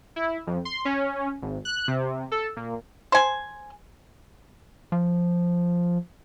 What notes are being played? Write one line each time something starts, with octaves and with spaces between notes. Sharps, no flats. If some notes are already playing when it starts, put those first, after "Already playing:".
E4
F2
C6
C#4
G#1
F#6
C3
A4
A#2
C5 G#5
F3